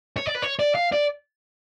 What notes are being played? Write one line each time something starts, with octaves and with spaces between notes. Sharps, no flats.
C#5
D5
B4
C#5
D5
F5
D5